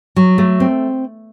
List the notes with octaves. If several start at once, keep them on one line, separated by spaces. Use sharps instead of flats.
F#3
A3
C4